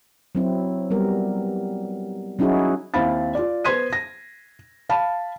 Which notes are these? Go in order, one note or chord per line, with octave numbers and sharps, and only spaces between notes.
F#3 C4 E4
G3 B3 A#4
F#3 C#4 D#4 E4 F#4 G#4
D#2 C4 E4 F5 B5 A6
F4 D5
B3 C5 C6 G#6 B6 D#7
A#6
F5 A5 B5